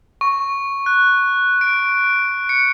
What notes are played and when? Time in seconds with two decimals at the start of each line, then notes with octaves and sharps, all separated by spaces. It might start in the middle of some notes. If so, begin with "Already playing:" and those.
0.21 C#6
0.86 F#6
1.61 D7
2.49 C#7